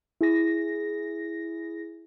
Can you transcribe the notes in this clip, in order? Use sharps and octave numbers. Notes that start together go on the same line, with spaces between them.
E4 G#4 A#6